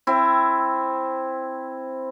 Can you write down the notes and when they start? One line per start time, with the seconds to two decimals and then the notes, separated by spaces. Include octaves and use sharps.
0.07 C4 E4